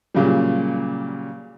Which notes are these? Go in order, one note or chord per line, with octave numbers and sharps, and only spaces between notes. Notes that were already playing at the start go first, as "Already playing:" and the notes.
A#2 C#3 F#3 G3